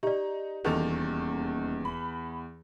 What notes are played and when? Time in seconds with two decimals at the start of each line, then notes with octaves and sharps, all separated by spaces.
0.03 D#4 G4 D5
0.65 D#1 E2 D#3 A4 F7
1.85 B5